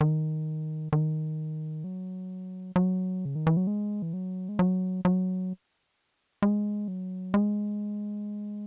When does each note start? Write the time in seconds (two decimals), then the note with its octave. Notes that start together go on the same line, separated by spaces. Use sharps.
0.01 D#3
0.93 D#3
1.84 F#3
2.76 F#3
3.25 C#3
3.35 D#3
3.47 E3
3.57 F#3
3.67 G#3
4.02 E3
4.13 F#3
4.49 G#3
4.59 F#3
5.05 F#3
6.42 G#3
6.88 F#3
7.34 G#3